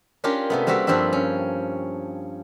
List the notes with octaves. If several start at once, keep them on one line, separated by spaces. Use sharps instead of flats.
C#4 D4 F4 G4 A#4
C3 A3 B3
G3 A#3 C4 F#4 E5
G2 F3 C4 D4 E5
C#4